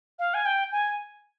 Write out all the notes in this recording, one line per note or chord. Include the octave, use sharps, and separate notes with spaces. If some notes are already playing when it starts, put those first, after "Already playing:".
F5
G#5
G5
G#5